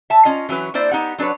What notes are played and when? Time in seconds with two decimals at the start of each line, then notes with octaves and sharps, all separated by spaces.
0.10 E5 A5
0.25 C#4 F4 D#5
0.49 E3 F#3 C#4 B4
0.74 A#3 D4 E4 C5 D5
0.91 B3 D#4 G4 F#5
1.18 F#3 D4 A4 B4 C#5